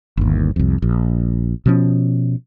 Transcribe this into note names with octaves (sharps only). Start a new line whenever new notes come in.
G1 D#2
C2 F2
A#1
B2 F3 C#4